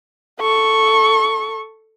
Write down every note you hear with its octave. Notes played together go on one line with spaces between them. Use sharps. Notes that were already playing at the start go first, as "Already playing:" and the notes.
A4 C#6